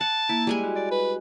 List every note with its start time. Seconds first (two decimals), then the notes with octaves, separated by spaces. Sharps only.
0.01 F#5 A5
0.29 A#3 E4
0.47 G3 G#3 G#5
0.64 F#4
0.76 D5
0.91 B4